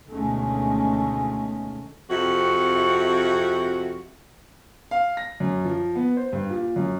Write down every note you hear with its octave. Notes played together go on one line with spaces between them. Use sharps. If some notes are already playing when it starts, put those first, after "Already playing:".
D2 B2 D#3 G#3 A3 C#4
F2 C3 F#4
F5
A#6
F#2
F3
B3
C5
G2
A#2
F#2